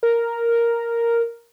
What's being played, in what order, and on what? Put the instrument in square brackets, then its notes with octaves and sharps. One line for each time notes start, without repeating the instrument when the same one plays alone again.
[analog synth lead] A#4